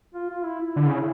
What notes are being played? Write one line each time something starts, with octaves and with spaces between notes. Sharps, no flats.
F4
F4
E4
E4
D3
C#3